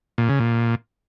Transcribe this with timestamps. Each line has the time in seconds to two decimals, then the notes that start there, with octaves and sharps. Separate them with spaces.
0.18 A#2
0.29 C#3
0.40 A#2